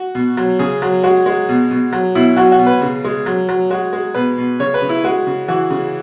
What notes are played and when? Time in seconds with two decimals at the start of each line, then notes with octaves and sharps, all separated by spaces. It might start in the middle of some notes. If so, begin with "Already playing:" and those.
Already playing: F#4
0.15 B2
0.37 F#3
0.59 C#3 G#4
0.82 F#3
1.03 G#3 F#4
1.26 G#3
1.49 B2
1.71 B2
1.93 F#3
2.15 B2 E4
2.37 F#3 F#4
2.52 F#4
2.59 B2
2.66 B4
2.82 C#3
3.05 G#3
3.26 F#3
3.49 F#3
3.71 G#3 F#4
3.93 G#3
4.15 B2 B4
4.38 B2
4.59 C#3 C#5
4.74 B4
4.82 C#3
4.89 E4
5.04 G#3 F#4
5.27 C#3
5.48 E3 F#4
5.70 C#3